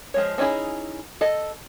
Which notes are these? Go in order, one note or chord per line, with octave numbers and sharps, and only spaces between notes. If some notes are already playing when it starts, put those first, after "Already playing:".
F3 G#3 C#5
C4 C#4 D#4 E4 G#4
A4 D#5